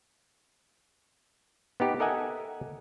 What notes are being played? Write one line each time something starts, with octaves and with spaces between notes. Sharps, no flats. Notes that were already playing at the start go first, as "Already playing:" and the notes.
B3 D#4 G4
A4 A#4 D#5 E5 F#5 G#5